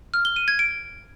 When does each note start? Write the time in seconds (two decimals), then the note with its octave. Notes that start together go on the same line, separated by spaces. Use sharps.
0.14 F6
0.25 G7
0.36 D#7
0.48 G#6
0.59 D7